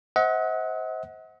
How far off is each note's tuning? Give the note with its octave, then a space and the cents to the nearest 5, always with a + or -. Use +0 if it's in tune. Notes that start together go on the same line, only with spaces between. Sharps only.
C5 +0 D#5 +45 F#5 +0